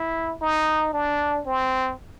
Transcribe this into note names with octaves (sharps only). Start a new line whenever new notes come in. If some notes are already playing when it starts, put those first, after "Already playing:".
Already playing: E4
D#4
D4
C4